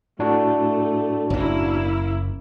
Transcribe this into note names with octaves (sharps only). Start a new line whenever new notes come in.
A2 A3 D4 F#4
F#1 A#3 C#4 E4